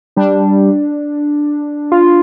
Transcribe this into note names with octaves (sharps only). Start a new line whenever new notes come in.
G3 D4
F4